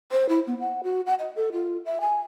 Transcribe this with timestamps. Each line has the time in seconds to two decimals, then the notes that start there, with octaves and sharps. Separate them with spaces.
0.12 C5
0.29 E4
0.47 B3
0.60 F#5
0.83 F#4
1.06 F#5
1.19 D#5
1.36 A4
1.52 F4
1.85 E5
2.01 G#5